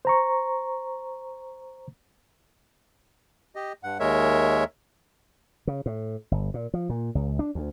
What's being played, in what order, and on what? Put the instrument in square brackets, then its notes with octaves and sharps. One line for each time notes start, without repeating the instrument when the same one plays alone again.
[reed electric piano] C5 A#5 C#6
[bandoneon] G4 D#5
G2 F#5
D#2 G#3 A#4 C#5 E5
[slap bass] C#3
A2
G1
A#2
F3
A#2
C#2
D4
D2